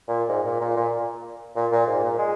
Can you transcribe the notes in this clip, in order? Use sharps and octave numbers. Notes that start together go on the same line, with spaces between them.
A#2
G#2
A#2
A#2
A#2
A#2
A#2
G#2
A#2
G#3